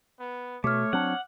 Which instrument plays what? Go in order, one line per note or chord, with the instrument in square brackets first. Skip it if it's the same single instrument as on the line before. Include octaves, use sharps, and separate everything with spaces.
[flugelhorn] B3
[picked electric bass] B2 [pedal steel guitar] A3 [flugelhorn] C#5 [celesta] D6 F6
[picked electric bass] F#3 C4 D4 [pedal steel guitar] F#5